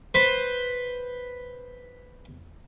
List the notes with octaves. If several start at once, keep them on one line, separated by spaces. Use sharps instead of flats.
B4 C5